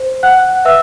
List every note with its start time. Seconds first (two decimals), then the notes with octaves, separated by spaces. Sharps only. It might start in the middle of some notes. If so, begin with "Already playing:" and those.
Already playing: C5
0.23 F#5 F#6
0.65 B4 E5 E6